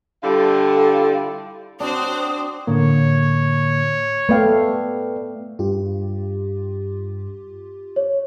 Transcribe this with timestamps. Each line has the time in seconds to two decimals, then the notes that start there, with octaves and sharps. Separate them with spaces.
0.24 D3 G3 E4 F4 A4
1.80 C4 D4 F#4 C5 D#6
2.67 A2 D3 A#3 C#5
4.29 A3 B3 B4 D5 F5 G5
5.59 G2 F4 G4
7.96 C#5